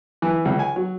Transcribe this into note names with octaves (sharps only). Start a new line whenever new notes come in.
E3
C#2
G#5
F#3